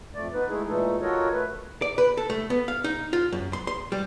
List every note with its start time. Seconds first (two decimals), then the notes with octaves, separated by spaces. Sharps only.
0.14 F2 A3 D5
0.33 B3 D#4 B4
0.49 G#3 A3 D#4 E4 G#4
0.67 A#2 E3 G#3 A3 D#4 A4
1.02 F4 F#4 A4 A#4 C#5 D#5
1.32 A3 B4
1.82 D5
1.98 B4
2.17 A4
2.30 A3
2.50 B3
2.68 F5
2.84 D#4
3.13 F4
3.32 F#2
3.53 C6
3.67 C6
3.92 G3